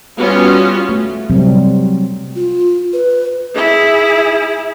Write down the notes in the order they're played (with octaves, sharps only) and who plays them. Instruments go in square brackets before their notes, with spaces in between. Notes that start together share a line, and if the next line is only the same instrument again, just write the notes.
[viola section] G3 B3 C#4 F4 F#4
[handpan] A3
C3 F#3 G3 C4
[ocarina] F4
B4
[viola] E4 G#4